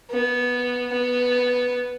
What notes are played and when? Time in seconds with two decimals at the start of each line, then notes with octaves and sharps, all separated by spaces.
0.11 B3
0.93 B3